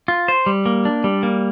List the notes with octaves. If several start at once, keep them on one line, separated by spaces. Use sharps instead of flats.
F4
C5
G3
A#3
D4
G3
A#3